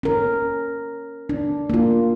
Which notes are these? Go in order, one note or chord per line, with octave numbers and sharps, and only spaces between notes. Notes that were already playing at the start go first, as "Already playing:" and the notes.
C#4 A#4
D4
A#3 F4